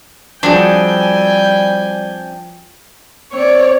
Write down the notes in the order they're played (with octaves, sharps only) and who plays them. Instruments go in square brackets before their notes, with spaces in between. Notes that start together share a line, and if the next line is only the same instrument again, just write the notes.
[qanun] F3 F#4 G#4 [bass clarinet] G3 [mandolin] C4 D4 [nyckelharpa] G5 G#5
[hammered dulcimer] C4 [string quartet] C#5 D5